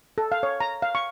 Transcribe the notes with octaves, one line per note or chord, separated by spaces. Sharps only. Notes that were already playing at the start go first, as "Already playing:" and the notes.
A4
F5
C#5
A#5
F5
C#6